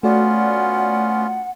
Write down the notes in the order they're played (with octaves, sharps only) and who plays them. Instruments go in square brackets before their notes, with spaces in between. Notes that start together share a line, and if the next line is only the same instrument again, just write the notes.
[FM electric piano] A3 F#4 D5 [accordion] B3 C#4 F4 [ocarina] F#5